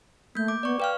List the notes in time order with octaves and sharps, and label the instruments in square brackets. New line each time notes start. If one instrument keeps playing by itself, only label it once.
[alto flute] A3 [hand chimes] A#3 G6
[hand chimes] D6
[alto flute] B3 [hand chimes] D5 C#6
[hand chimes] B4 F5 F6 [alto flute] G5